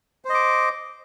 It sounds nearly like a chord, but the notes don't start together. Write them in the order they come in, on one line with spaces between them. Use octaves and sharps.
C5 D#5 D6